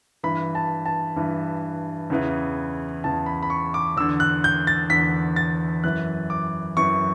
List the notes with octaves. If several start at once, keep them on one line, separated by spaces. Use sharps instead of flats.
G2 E3 B5
A5
A5
G2 E3
E2 C#3 E3
E2 C#3 E3 A5
B5
B5
C#6
D6
E2 D3 E6
F#6
G6
A6
E2 D3 B6
A6
F#2 E3 F#6
D6
F#2 E3 C#6